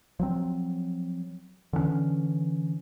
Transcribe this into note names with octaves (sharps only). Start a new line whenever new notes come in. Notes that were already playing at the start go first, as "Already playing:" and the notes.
F3 F#3 C4
D3 E3 G3 C#4